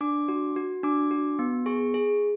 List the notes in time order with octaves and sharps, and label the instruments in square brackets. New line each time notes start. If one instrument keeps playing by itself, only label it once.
[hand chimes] D4 D6
F#4
F#4
D4 D6
F#4
B3
G#4 C#6
G#4